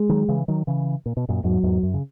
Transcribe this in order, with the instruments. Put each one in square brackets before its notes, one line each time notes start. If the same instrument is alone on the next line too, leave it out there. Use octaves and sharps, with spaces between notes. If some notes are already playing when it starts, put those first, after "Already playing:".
Already playing: [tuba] G#3
[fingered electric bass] D#3 F#3
C#3 E3
D#3 F#3
C#3 E3
A#2
B2
F#2 A#2
[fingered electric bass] E2 G#2 [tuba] F#3
[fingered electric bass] E2 G#2
F#2
C#3